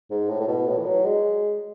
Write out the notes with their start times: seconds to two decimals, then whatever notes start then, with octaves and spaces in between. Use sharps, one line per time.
0.11 G#2
0.29 A2
0.40 A2
0.48 B2
0.68 A2
0.77 E3
0.86 F#3
1.05 G#3